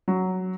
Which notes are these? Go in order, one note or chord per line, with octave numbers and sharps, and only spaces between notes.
F#3